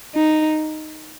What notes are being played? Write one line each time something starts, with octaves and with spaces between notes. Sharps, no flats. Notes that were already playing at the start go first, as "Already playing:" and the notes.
D#4